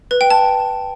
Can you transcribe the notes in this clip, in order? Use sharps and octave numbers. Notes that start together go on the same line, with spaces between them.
B4
G5
A5